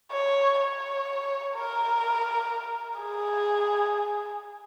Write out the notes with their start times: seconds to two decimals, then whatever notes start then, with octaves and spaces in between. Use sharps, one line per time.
0.12 C#5
0.60 C#5
1.55 A#4
3.00 G#4